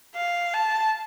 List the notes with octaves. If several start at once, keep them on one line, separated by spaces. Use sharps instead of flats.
F5
A5